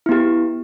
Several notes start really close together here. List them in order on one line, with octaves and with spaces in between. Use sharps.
E4 B3 G4